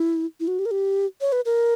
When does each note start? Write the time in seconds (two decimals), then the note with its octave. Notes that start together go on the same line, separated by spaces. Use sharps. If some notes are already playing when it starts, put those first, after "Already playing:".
Already playing: E4
0.40 E4
0.48 F#4
0.59 G4
0.66 A#4
0.72 G4
1.21 C#5
1.32 B4
1.45 A#4